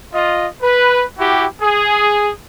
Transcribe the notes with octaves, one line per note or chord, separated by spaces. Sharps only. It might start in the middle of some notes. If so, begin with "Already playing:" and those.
F4 D#5
B4
E4 F#4 G4
G#4